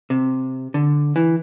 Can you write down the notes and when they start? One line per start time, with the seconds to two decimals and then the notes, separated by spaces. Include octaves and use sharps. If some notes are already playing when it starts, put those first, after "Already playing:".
0.10 C3
0.74 D3
1.16 E3